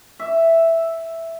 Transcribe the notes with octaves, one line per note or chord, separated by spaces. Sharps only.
E5